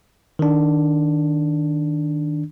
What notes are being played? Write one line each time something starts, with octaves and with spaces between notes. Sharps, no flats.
D#3 D4